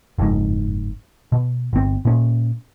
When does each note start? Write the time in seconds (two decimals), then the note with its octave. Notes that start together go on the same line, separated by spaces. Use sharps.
0.18 F#1 F2 G#2
1.32 B2
1.73 G1 C4
2.05 A#2 C#4